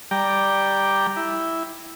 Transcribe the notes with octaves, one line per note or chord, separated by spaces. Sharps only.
G3 D5 G5 A#5
E4